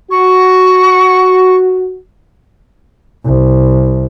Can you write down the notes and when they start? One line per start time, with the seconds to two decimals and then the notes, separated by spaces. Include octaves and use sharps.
0.11 F#4 C#6
3.25 C2